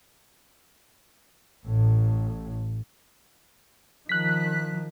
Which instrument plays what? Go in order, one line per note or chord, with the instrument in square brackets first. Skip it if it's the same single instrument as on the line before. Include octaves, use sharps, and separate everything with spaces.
[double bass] A1 A2
[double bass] D#3 F3 [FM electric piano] F#6 B6